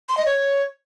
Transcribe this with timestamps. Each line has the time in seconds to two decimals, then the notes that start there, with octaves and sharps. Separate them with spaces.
0.09 C6
0.17 D#5
0.26 C#5